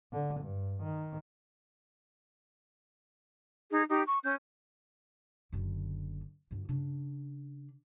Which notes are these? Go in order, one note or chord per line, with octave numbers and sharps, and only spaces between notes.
D3
G2
D#3
D#4 G#4
D#4 G4
C#6
C#4 G6
F#1 D3
D2 G2
C#3 D4